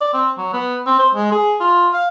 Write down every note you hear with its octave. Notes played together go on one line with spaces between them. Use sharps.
D5
C4
F#3
B3
C4
C5
G#3
G#4
F4
F5